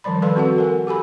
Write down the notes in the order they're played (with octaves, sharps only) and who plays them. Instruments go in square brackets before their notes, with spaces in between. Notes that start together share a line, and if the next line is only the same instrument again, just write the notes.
[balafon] D#3 F3 G3 D5 B5
A4 B4 D5 F5 A5 C6
C4 F#4 A4 F#5
A4 A#4 F#5 G#5
G4 A4 G#5 B5